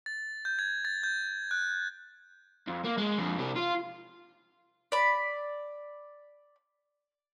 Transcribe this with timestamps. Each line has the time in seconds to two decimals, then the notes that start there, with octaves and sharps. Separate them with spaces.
0.06 A6
0.45 G6
0.59 G#6
0.85 A6
1.03 G6
1.51 F#6
2.68 F2
2.85 A#3
2.98 G#3
3.18 F2 D4
3.38 C3 G3
3.56 F4
4.92 D5 B5